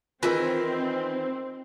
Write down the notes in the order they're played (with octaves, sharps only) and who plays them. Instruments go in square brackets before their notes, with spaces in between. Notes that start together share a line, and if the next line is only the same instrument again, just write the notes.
[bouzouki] D#3 E3 [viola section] C4 [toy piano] F4 G#4 A#4